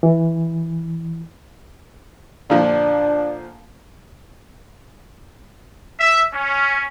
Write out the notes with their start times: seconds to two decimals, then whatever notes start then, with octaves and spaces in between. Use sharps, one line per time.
0.03 E3
2.50 A#2 D3 F3 D4
6.00 E5
6.33 C#4